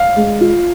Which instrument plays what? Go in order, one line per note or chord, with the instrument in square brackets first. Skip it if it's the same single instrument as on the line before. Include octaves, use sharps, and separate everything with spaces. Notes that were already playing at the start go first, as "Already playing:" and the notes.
Already playing: [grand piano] F5
[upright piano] G#3
F4